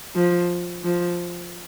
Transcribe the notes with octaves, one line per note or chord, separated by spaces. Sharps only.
F3
F3